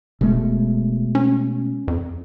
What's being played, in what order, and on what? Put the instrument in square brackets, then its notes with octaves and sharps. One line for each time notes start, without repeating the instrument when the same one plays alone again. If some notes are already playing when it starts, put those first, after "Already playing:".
[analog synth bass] F1 [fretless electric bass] B2 G#3 A3
[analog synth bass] C#4
F2